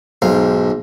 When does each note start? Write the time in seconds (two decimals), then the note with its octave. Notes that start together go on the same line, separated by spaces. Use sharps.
0.22 B1 G#2 F5